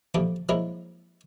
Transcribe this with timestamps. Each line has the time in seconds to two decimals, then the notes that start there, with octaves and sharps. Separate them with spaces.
0.14 F2 A#2 D3 F3 G3 A3
0.49 F3 F#3 G#3 A#3 E4 A#4